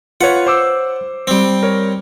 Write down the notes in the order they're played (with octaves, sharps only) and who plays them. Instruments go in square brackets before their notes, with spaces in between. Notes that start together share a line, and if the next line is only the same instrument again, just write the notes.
[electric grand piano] F4 B4 C#5 [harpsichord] F#5
[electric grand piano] C5 D6 E6
[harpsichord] G3 C4
[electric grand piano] A#4 C#5